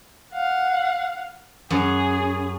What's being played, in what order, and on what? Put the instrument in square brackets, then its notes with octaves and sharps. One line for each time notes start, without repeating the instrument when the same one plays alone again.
[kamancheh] F5 F#5
[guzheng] F#2 [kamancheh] G#4